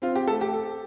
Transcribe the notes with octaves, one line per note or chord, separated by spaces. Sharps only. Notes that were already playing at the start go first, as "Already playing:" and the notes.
C4 F4
G4
A3 A4
G4
A4